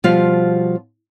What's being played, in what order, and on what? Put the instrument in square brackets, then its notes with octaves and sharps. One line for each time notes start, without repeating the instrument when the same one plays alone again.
[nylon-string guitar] B2 F3 G3 F4 C5 F5